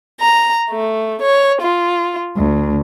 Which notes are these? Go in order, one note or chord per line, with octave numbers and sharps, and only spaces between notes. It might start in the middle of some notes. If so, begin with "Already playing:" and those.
A#5
A3
C#5
F4
D2